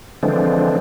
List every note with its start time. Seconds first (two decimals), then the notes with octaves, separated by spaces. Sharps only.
0.23 D3 E3 F3 G#3 C4 D4